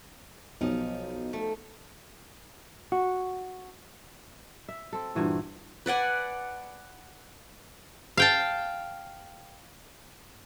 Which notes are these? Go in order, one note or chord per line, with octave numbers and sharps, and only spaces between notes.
B1 F3 D#4
A3
F#4
E5
C4 A4
G2 A#2 E3 F#4
B4 D5 F#5 G#5
F5 G5 A5